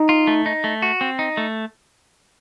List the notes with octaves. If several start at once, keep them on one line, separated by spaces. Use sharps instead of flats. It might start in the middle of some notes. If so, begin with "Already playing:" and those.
Already playing: D#4
F4
A3
D#4
A3
F#4
C4
D#4
A3